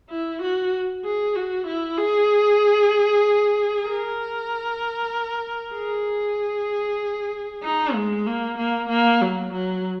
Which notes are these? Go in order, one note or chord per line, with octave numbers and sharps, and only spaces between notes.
E4
F#4
G#4
F#4
E4
G#4
A#4
G#4
D#4
G#3
A#3
A#3
A#3
F#3
F#3